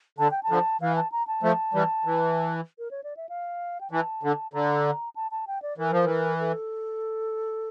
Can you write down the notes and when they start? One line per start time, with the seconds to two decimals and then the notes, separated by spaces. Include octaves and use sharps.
0.18 D3 A5
0.31 G5
0.43 A5
0.49 D3 F3
0.81 E3 F5
0.96 A5
1.12 A#5
1.27 A5
1.43 F3 A3
1.74 E3 G3
2.05 E3
2.79 A#4
2.91 C#5
3.04 D5
3.17 E5
3.29 F5
3.81 G5
3.91 E3 A5
4.23 D3
4.53 D3 A#5
5.16 A5
5.31 A5
5.47 G5
5.62 D5
5.78 E3 A#4
5.92 F3
6.04 E3
6.40 A4